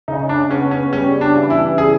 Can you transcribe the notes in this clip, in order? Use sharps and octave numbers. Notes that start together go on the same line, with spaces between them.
C#3 D#4
D4
B3 C#4
C#4
G3 C#4
D4
E3
E4
G#4